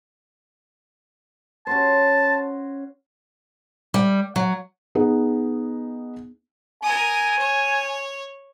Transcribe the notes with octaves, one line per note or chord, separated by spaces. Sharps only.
C#4 F#4 C5 A5
G3
F#3
B3 D#4 G#4
A#4 G#5 D#6
C#5